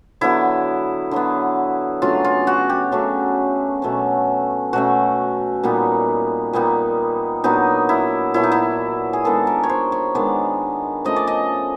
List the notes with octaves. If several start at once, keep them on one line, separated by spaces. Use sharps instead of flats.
D3 F#3 B3 E4
D3 F#3 B3
C#3 F#3 A3 D4 F4
F4
F#4
G4
C#3 F#3 A3 D4 F#4
B2 F#3 A3 C#4
B2 F#3 A3 C#4 F#4
A#2 G3 B3 D#4
A#2 G3 B3 D#4
A#2 F#3 B3 D4 D#4
E4
A#2 F#3 B3 D4 E4
D#4
E4
G#4
D#3 G#3 B3 D4 A4
A#4
C#5
C5
C#5
D#3 G#3 B3 D4 D5
F3 A3 C#4 D#5
D5
D#5